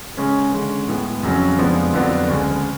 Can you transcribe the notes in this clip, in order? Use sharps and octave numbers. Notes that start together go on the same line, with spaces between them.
C#3 G#3 C#4
D3 G#3 C#4
A2 G#3 B3
F2 C#3 F#3 C#4
F2 F3 G#3 B3 D4
F2 D3 F#3 B3 D4
D2 C#3 G#3